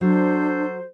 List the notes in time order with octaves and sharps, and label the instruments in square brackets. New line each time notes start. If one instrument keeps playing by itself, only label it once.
[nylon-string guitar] F#3 [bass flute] D4 [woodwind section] F#4 A4 C5